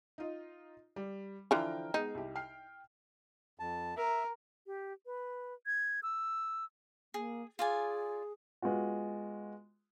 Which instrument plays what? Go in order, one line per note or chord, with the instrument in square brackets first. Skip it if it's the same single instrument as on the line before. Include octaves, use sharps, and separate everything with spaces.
[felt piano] D#4 F4 D#5
G3
[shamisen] D3 E3 F3 [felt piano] G5 A#5 F6
[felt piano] G#3 B3 G#4 [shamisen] D#4
[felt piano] C2 G4
G5 F6 C7
[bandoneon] F2 A5
[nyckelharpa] A#4 [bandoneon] E5
[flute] G4
B4
G#6
E6
[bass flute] A#3 [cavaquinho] G#4
[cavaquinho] F4 D5 G#5 [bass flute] G#4
[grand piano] G#3 B3 F4 F#4